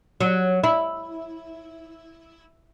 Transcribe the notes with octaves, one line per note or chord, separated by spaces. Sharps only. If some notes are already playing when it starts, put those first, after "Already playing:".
F#3
E4